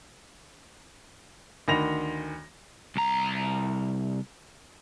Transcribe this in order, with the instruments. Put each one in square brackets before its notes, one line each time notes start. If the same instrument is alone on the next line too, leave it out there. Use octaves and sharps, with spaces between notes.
[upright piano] D2 D#3 B5 A#6 F7
[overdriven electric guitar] C2 A#5